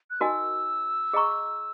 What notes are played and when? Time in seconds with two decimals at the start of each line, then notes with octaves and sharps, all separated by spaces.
0.10 F#6
0.21 D#4 F#4 A#4 D#5 G#5 E6
1.13 G#4 D#5 A#5 C#6